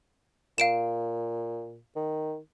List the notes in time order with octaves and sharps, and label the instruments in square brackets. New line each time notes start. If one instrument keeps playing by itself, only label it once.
[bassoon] A#2 [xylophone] F5 D7 E7
[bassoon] D#3